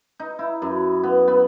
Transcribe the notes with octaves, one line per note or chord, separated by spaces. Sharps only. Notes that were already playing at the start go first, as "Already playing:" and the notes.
D#4
E4
F#2
B3
B3